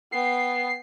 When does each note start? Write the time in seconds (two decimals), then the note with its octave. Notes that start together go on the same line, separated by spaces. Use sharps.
0.12 B3 G5 C7